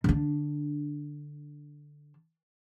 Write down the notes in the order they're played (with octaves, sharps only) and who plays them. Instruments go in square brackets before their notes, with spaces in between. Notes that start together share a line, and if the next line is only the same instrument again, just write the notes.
[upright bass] D3 D4